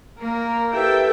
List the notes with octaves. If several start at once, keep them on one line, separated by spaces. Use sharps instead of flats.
A#3 A#4
E4 G4 A4 B4 E5 G5